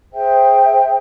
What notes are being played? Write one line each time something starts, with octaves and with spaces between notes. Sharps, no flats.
G#4 C5 E5 G5